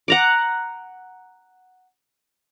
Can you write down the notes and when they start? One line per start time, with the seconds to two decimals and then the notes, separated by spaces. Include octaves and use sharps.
0.08 F#5 A#5 D6